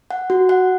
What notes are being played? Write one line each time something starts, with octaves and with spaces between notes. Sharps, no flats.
F#5
F#4
F#5